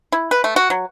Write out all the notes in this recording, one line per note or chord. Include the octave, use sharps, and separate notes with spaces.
E4
B4
A3
F#4
F#3